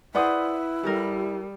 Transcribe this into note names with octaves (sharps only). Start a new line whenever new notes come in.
E4 G#4 B4 C5 D5 F#5 D#6
G3 G4 A4 A#4